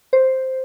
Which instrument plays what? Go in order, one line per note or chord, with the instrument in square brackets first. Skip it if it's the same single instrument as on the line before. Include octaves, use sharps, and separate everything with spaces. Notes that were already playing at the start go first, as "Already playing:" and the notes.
[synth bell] C5